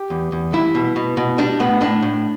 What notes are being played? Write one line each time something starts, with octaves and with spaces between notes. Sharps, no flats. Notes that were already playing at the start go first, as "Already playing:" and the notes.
Already playing: G4
E2
E2
G3 E4
B2
B2
B2
G3 D4
A2 B3
A2 D4
A2